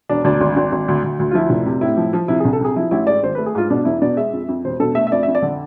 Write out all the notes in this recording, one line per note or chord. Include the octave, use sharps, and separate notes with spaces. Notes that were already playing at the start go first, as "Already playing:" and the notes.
E1 D4
D2 D4
G#1
G#1
G#1
D2
D2
D2
F4
F3 E4
F1
C3
A2 E4
F3
F3
C3 E4
G#4
C2
A4
C3 G#4
F3 E4
A1 E4
G#2 D5
G#1 C5
A3 B4
G#4
G#2 F4
B2 D4
E2 E4
B2 D5
G#3 E5
F2
F2
E1 C5
B2 A4
A3 E5
E5
F2 D5
E5
F2
D5
D3